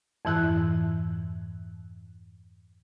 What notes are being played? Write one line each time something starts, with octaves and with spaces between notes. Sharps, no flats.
F2 G#2 E3 E4 F#6 G#6